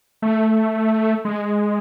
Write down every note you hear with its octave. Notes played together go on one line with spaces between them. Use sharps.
A3
G#3